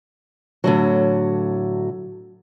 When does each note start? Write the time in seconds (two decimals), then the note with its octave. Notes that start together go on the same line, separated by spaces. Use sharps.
0.64 A2 D3 F#3